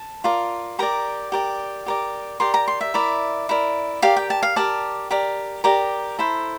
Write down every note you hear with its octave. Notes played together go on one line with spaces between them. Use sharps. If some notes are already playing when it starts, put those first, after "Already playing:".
Already playing: A5
F4 A#4 D5
G4 A#4 D5 A#5
G4 A#4 D5
G4 A#4 D5
G4 A#4 D5 C6
A#5
C6
E5
E4 A#4 D5
E4 A#4 D5
G4 A#4 D5 F5
G5
A5
F5
G4 A#4 D5 A5
G4 A#4 D5
G4 A#4 D5 A#5
E4 A4 C5